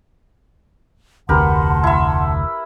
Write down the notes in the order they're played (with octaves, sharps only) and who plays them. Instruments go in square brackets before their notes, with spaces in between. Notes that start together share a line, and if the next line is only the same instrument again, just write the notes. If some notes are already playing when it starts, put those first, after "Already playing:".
[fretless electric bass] F1 D2 [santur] G4 A#4 B4 [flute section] F#5 A5 C6
[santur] E4 E5